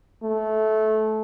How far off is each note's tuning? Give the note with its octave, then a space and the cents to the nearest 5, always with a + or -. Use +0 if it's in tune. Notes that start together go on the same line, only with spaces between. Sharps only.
A3 -20